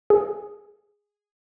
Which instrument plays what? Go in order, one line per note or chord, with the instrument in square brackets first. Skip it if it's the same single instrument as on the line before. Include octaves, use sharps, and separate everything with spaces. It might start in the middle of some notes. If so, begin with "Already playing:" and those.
[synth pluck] G#4